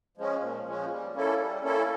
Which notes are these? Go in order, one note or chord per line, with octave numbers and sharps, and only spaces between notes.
F3 G#3 C#4
A#2
F3 G#3 C#4
G3
A#3 C#4 E4 A4
G3
A#3 C#4 E4 A4